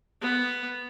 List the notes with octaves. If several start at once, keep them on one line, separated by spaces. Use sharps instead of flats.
B3